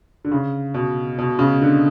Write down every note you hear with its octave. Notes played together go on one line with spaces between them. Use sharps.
D3
C#3
B2
B2
C#3
D3